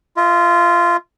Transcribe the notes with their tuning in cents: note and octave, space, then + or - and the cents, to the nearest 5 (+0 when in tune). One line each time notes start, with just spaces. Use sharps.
F4 -15 D#5 +45